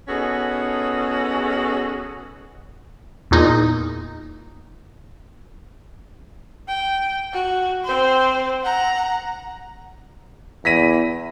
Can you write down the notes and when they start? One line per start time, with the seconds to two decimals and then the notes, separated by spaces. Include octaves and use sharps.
0.08 B3 C#4 D#4 F#4 G#4 A4
3.31 E2 A#2 D#4
6.68 G5
7.33 F#4
7.84 C4 C5
8.64 F#5 A#5
10.65 E2 A#6 B6 D#7